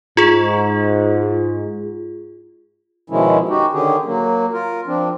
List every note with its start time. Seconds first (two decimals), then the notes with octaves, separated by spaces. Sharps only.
0.17 G#2 F4 G#4
3.10 B2 D#3 F3 G#3 C#4 E4
3.49 D#4 F#4 G4
3.73 D3 D#3 C#4 G4 G#4
4.05 F#3 A#3
4.53 F4 A#4
4.87 F3 C4 D4